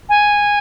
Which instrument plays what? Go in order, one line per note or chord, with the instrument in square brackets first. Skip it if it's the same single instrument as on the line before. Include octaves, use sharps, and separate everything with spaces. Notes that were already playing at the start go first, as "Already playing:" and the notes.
[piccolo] G#5